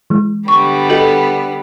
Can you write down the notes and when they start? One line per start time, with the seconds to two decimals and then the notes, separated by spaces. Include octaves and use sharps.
0.10 E3 G#3
0.48 D3 G3 B3 C#6
0.90 F#4 A4 D#5